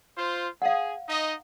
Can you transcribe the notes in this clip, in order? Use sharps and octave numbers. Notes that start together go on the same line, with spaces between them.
F4 C5
G#4 F5 F#5
D#4 D#5